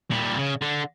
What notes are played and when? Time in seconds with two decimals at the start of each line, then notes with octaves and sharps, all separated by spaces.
0.11 A#2 G3
0.39 C#3
0.62 D3